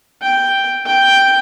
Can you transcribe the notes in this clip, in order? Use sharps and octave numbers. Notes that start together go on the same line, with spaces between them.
G5
G5